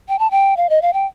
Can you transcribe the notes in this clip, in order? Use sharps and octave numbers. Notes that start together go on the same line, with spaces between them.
G5
A5
G5
F5
D#5
F5
G5